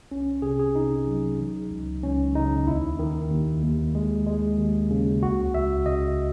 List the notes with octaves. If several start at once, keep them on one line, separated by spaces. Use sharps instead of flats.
C2 C#4
C3 G#4
G#4
C3 D#4
F#3
E3
C#2
C#2 C#4
C#3 D#4
D#2 E4
D#3
D#2
D#2
G#3
G#3
D#2
C#3
C#2 F#4
C#2 E5
C#3 D#5